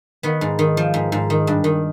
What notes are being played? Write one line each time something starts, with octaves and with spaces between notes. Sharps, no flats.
D#3 B3
G#2
D#3
F3
G#2
G#2
D#3
G2
D#3